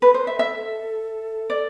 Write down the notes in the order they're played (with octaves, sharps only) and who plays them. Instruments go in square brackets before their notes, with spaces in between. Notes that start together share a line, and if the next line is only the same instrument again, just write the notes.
[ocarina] A4 [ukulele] B4
[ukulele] C5
E5
E5
D5